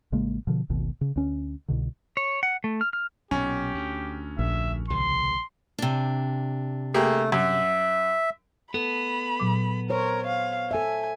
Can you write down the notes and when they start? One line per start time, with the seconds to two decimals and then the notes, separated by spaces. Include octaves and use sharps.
0.12 A1 C#3 G#3 A#3
0.47 B2 D3 F3
0.70 G#1 D2 B2 D#3
1.01 C#3
1.16 D2 C#4
1.68 C2 B2 D3
2.17 C#5
2.43 F#5
2.64 A3
2.81 F6
2.93 F6
3.31 B1 A#2 C#4 G4
3.75 D2
4.39 A#1 E5
4.90 C#2 C3 D#3 C6
5.79 C3 D4
6.94 A3 A#3 G4 G#4
7.32 F#2 E5
8.74 B3 A4 B5
9.40 A#2 F#3 D6
9.90 A#4 C5 C#5
10.27 F5
10.71 A4 E5 G#5